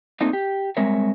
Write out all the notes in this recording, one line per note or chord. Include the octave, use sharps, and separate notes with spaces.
A3 A#3 C4 D4 D#4 F4
G4
G3 G#3 C4 A#4 C#5 E5